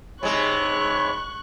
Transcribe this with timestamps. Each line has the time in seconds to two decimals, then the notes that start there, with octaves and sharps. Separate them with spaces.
0.23 G#2 C3 G#3 C#5 B5 C#6 F#6